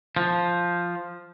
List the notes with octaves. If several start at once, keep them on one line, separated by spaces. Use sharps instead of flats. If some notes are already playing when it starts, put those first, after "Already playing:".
F3